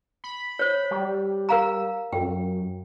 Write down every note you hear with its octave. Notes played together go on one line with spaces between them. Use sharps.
B5
C5 C#5
G3
A#4 F5 A#5
F#2 G5